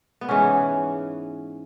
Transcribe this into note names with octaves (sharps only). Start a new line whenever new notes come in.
B3
G#2 E3 C#4